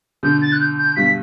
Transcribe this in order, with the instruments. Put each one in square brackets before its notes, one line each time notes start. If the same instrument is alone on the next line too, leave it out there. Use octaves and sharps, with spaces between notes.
[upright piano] B2 D3 [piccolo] G6
[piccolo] A6
F#6
G6
G6
[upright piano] G2 B2 [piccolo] B6